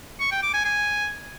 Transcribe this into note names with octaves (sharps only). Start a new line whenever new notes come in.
C#6
G5
D6
G#5
G#5